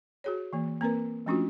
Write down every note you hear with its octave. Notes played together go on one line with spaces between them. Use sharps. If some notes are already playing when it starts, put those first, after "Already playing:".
F#4 G#4 C#5
E3 A#3
A#3 C4 A#4 B4
F3 A3 C#4 D4 F4 F#4